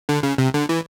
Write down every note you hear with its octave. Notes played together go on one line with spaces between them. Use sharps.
D3
C#3
C3
D3
E3